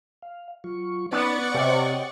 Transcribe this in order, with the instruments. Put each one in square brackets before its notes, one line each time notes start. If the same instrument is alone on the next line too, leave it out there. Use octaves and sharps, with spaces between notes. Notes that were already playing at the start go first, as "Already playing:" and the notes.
[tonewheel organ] F5
F#3 F4 C#6
[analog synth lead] B3 [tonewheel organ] C#4 D#4 [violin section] D5 F#5 C#6
[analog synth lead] C3 [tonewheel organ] C#5 D#5 G5